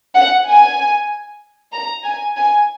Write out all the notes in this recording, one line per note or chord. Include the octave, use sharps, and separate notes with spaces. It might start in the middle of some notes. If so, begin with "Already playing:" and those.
F#5
G#5
A#5
G#5
G#5